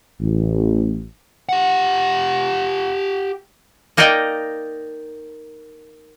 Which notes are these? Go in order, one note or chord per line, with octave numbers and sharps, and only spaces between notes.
A1
G4 F#5
A#3 D#4 A#4 D5 D#5 G5